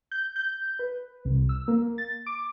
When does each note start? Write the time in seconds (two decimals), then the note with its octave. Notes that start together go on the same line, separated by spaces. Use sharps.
0.11 G6
0.36 G6
0.79 B4
1.25 C2
1.49 E6
1.68 A#3
1.98 A6
2.26 D6